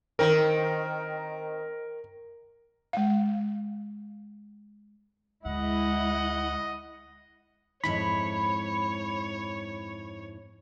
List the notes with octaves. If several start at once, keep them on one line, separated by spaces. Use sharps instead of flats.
D#3 C4 A#4
G#3 F5
D2 G#3 E4 D#5 F#5
F2 G#2 E4 C#5 B5